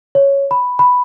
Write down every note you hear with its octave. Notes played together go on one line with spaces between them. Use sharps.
C#5
B5
B5